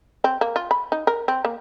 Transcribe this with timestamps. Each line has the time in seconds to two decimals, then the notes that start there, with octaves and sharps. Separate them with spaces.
0.24 C4
0.41 A#3
0.56 F4
0.71 B5
0.92 D#4
1.07 A#4
1.28 C4
1.45 A#3